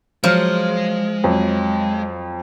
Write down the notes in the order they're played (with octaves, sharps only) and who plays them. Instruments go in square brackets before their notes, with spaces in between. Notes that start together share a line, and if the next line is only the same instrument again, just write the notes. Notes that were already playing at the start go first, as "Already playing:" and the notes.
[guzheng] F3 [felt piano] F#3 F6 [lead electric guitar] G#3
[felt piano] F2 F#3